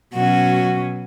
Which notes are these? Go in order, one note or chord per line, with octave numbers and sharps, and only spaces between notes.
B2 F#3 C#4 F#4